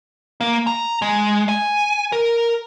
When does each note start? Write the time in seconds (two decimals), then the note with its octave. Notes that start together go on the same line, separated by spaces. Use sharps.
0.41 A#3
0.67 A#5
1.02 G#3
1.49 G#5
2.12 A#4